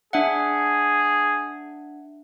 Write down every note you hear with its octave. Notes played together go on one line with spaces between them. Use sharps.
D4 G#4 E5 F#5